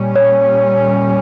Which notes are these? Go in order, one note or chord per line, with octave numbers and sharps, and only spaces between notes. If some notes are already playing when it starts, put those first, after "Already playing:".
Already playing: A#2 G3 C#4
C#5